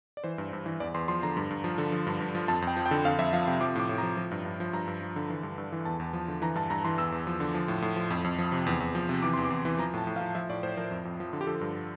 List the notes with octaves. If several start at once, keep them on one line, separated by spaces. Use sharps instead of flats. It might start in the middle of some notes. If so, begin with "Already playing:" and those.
D5
E3 C5
G2
G2
E3
E2 D5
E2 C6
F3 C6
D3 A#5
G2
G2
F3
D3
F3
G2
G2
F3
F2 A5
F2
G5
F3
G5
D3
F2 F5
F2 E5
F3 F5
C3 G5
F3 D6
A2 D6
A2
A#5
F3
F3
G2
G2
F3
G2 A#5
G2
F3
D3
E3
G2
G2
E3
E2 A5
E2
F3
D3
E3 A#5
G2 A5
G2 A#5
E3 C6
E2 E6
E2
F3
D3
F3
A2
A2
F3
F2
F2
F3
C3
E2
E2
F3
C3
E3 D6
E2 C6
D6
E2
E3
F3 A#5
A2 A5
A2
F5
F3
F3 E5
A2 D5
A2 C5
F3 A#4
F2
F2
F3
D3
G4
F3 A4
G2